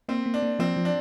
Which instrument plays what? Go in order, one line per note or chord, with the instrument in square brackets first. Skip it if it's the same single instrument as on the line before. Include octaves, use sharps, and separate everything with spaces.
[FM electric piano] A#3 [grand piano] C4
[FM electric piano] A#3
[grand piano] D4
[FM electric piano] A#3
[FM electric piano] F3 [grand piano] C4
[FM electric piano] F3
[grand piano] D4